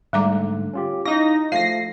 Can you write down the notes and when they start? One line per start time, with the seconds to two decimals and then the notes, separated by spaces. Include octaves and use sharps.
0.13 G#2 D3 G3 A3 A#5 D6
0.74 C#4 F4 G4
1.05 D#4 E4 F5 A#6
1.52 F3 A3 F5 A#6 C7